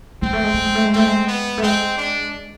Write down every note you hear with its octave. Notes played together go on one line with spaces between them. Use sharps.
G#3 C4
A3
G#3
A3
G#3
A3
G#3
A3 C4
G#3
B3
A3
G#3 C4
D4